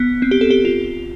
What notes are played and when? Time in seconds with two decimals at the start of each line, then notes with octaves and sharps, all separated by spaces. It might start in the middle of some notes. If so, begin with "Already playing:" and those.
Already playing: B3
0.22 C4
0.31 G4
0.41 A4
0.50 G4
0.65 F4